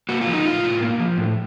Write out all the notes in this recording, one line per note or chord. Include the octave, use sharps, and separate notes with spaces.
A#3 F#4
F4
F3
D#4
A2 F4
A2
A#3
F3
A2